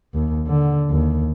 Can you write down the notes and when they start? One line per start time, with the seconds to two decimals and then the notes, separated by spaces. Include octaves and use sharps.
0.14 D#2
0.47 D3
0.91 D#2